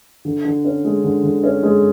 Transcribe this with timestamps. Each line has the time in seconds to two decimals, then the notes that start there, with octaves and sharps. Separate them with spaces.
0.25 D3
0.45 D3
0.65 C#4
0.85 G#3
1.04 D3
1.24 D3
1.44 C#4
1.63 G#3